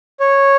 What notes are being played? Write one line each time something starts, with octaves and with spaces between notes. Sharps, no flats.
C#5